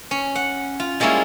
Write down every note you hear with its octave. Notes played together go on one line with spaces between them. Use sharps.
C#4
F#5
F4
G3 G#3 A#3 C#4 E4 F4